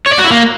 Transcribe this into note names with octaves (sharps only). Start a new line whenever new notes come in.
C#5
D5
F#4
E4
A#3